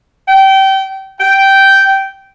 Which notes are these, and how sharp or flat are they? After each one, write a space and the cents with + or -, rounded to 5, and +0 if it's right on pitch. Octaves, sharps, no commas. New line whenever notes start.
G5 -25
G5 -10